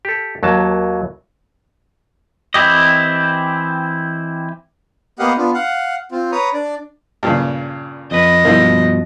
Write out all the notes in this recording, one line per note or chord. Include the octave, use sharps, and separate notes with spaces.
G4 A4
D#2 F#3 A#3 A5
E3 C4 E4 G4 D#5
A#3 B3 G4 D#5 F5 F#5
B3 D4 F4
F5 F#5
C4 F4
B4 C#5 A#5 D#6
D4 D5
G2 A#2 C#3
F2 B4 D#5
G2 B2 F3 A#3 E4 C5